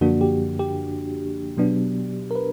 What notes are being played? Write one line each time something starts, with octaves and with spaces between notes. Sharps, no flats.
F#2 D3 F3 A#3 D4 F#4
G4
G4
B2 F#3 B3 D4
A#4
B4